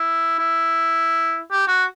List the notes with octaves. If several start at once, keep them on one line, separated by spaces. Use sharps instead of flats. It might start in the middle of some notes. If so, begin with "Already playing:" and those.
Already playing: E4
E4
G4
F#4